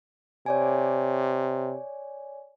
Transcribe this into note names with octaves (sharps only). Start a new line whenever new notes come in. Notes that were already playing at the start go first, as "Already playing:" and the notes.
C3 C#5 D5 G#5